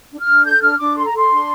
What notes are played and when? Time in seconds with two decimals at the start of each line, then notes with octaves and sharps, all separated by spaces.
0.11 D4
0.20 F6
0.28 D4
0.45 A4 G6
0.62 D4 F6
0.79 D4 D6
0.96 A4 C6
1.06 A#5
1.13 A4 C6
1.30 D4